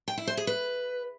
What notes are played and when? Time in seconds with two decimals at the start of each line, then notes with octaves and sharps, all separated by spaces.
0.08 G5
0.18 E4
0.27 C5
0.37 G#4
0.47 B4